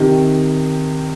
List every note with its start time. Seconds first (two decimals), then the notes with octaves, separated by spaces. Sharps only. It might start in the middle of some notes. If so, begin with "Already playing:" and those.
Already playing: C3 D#3